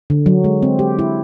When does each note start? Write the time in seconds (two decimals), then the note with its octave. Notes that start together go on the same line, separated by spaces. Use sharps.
0.10 D3
0.26 F#3
0.44 G#3
0.62 C4
0.79 G4
0.99 E4